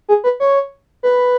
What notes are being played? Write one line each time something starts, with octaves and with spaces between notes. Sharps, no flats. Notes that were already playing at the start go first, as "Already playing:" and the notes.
G#4
B4
C#5
B4